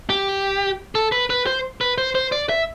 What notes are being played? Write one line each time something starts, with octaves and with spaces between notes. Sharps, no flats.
G4
A4
B4
B4
C5
B4
C5
C5
D5
E5